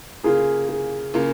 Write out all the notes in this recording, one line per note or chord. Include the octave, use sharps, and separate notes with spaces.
C#3 A#3 F4 G#4
G#4
C#3 A#3 F4